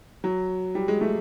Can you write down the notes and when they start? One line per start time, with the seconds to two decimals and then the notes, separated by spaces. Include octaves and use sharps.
0.24 F#3
0.75 G3
0.88 G#3
1.01 A3